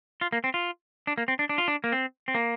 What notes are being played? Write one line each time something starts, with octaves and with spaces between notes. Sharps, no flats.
F4
A#3
C4
F4
D4
A#3
C4
D4
D4
F4
D4
A#3
C4
C4
A#3